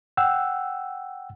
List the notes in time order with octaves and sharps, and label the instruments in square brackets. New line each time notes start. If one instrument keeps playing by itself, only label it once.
[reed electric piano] F#5 G5 E6